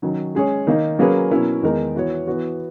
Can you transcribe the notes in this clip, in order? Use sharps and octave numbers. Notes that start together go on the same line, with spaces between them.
D#3 F#3 C#4
G#3 C#4 G#4 C#5
D#3 A#3 D#4
F#3 A#3 C#4 G#4 B4
B2 F#3 C#4 E4 A#4
E2 D#3 G#3 D#4 A#4
E3 B3 F#4 C#5
E3 B3 F#4